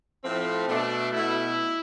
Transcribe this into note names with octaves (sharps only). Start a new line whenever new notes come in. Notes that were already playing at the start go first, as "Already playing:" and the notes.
A2 F3 A3 C4
B2 A3 D4
B2 A3 E4